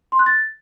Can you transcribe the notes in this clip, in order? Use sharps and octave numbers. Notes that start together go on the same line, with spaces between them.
C6
F#6
A6